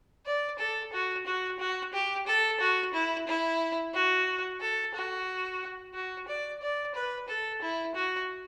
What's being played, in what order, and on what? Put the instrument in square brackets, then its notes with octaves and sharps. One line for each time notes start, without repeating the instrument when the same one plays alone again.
[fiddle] D5
A4
F#4
F#4
F#4
G4
A4
F#4
E4
E4
F#4
A4
F#4
F#4
D5
D5
B4
A4
E4
F#4